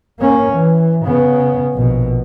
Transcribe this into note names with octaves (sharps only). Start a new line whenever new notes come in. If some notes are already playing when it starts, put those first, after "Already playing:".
A#3 C#4
E3
C#3 B3
A#1 B2